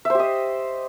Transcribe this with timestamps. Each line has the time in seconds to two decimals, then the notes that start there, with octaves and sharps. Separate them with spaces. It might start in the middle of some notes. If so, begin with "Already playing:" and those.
0.05 E5
0.10 C5
0.15 G4
0.20 D#5